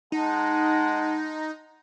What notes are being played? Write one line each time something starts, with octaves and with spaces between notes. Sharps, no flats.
G#3 D#4 F#5 A5